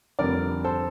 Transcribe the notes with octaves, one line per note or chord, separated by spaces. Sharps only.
F1 F2 D3 G3 A#4 D5
A4 C5